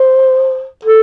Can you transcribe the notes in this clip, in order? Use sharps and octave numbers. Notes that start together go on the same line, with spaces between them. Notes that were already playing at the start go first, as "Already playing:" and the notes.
Already playing: C5
A4